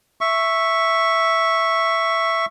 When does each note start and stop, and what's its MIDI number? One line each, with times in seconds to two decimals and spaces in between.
0.21 2.46 76
0.21 2.46 85